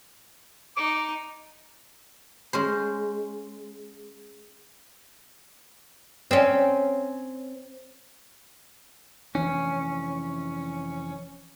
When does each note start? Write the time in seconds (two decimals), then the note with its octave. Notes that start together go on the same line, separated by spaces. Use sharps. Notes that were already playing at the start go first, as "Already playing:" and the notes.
0.77 D#4 D6
2.53 G#3 C#4 C5
6.31 C4 C#4
9.35 F1 E3 C#4 D4